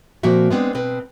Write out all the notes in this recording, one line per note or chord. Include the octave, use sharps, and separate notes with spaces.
A#2 F3 A#3 C4 F#4 E5
G#3 B3 C4 D4
B2 C4 B4